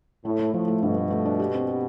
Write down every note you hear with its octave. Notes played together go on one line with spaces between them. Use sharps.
A2 A3
A3
A2 F3
A3
G2 B2
A3
A3
D4
G4
C4
G4